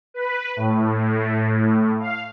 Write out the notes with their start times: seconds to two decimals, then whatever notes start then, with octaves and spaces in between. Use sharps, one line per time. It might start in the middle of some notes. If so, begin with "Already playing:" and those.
0.14 B4
0.56 A2
2.00 F5